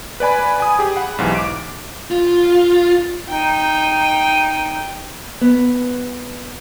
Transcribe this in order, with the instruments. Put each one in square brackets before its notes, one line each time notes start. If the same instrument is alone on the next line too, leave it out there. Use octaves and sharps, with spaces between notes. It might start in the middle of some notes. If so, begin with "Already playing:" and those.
[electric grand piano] B4 D5 G#5 B5
G#5 D#6
G4 G#4
F#5 B5
B1 G#2 E3 G4
D6 D7
[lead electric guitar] F4
[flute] D#4 [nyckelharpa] G5
[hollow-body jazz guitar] B3